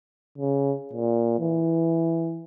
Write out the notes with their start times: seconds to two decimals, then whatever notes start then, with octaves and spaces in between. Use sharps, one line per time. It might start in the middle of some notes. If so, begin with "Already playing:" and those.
0.38 C#3
0.93 A#2
1.40 E3